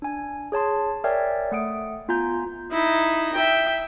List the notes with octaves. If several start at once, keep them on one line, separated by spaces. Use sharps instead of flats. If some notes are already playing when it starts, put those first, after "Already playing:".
D4 G#5
G#4 C#5 A5 C6
A#4 C#5 D5 E5 G5 G#5
A3 F#5 D#6 D7
B3 F4 G#5 A#5 G6
D#4 E4
E5 G5